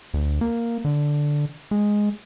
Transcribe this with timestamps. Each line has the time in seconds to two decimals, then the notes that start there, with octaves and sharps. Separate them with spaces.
0.14 D2
0.41 A#3
0.85 D3
1.71 G#3